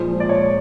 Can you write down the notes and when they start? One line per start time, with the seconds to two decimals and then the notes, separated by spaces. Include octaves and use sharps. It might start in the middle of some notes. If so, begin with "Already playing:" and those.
Already playing: A#2 F3 G#3 C5
0.20 D5
0.29 C#5